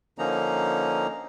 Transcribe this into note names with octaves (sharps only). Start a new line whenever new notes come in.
D3 F3 A#3 C#4 D#4 A#5